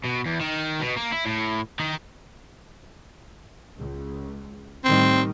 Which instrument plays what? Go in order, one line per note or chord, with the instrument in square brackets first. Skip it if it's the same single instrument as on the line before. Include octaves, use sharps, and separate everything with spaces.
[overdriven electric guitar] B2
E2
D#3
B2
A#3
E4
A2
D#3
[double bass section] C#2
[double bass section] A2 D#3 G3 [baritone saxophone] C4